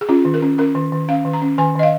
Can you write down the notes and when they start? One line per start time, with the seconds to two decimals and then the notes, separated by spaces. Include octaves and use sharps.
0.01 G#4
0.09 C#4 F4
0.25 D#3
0.34 A#4
0.42 C#4
0.58 C#4 A#4
0.75 D#3
0.92 D#3
1.08 C#4 F5
1.25 D#3
1.33 A#5
1.42 C#4
1.58 D#3 G#5
1.75 D#3 D#5
1.83 F5